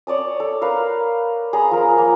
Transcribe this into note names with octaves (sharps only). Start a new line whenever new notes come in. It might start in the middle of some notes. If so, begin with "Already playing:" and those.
C#5 D5 A5 D#6
A4
A#4 B4 F5
G#4 A#5 B5 D#6
F3 A#4
A#3